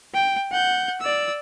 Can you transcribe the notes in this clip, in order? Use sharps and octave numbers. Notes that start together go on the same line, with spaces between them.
G5
F#5 G6
D5 E6